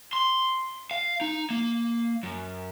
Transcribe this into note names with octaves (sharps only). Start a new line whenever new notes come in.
C6
F5
D#4
A#3
F#2